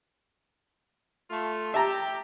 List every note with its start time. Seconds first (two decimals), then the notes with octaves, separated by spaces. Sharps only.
1.30 A3 F4
1.74 G4 E5 A5 A#5